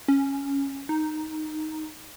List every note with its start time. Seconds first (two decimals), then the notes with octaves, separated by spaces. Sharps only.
0.08 C#4
0.89 D#4